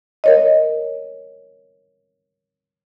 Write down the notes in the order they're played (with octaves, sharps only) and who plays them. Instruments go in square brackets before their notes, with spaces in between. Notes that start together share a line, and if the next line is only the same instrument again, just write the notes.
[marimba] A#4 C#5 D#5